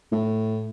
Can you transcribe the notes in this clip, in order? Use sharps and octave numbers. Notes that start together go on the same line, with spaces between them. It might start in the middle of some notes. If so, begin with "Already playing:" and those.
A2